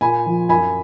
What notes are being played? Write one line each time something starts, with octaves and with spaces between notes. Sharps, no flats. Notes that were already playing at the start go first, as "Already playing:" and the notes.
A#2 G#5 B5
F3
F#2 G#5 B5